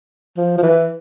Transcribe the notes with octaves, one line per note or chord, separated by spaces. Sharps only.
F3
F3
E3